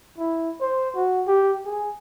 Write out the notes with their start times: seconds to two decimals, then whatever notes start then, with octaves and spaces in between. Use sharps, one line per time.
0.19 E4
0.61 C5
0.95 F#4
1.27 G4
1.66 G#4